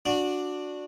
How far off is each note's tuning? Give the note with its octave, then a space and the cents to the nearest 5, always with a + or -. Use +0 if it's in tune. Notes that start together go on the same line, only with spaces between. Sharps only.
D4 +0 F#4 -20